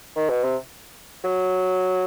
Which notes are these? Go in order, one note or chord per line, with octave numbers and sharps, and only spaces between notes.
D#3
B2
C3
F#3